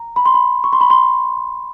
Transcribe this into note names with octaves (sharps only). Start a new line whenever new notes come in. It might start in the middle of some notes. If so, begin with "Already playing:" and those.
Already playing: A#5
B5
C6
B5
C#6
C6
B5
C6